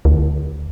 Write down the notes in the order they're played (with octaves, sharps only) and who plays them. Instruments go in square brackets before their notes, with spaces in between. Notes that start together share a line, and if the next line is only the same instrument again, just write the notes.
[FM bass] D2